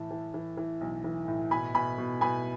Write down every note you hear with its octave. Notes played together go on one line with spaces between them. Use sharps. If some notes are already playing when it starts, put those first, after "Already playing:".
Already playing: A2 E3 A5
E3
E3
E3
B1
E3
A2
B2 G#5 B5
B2 G#5 B5
B2
B2 G#5 B5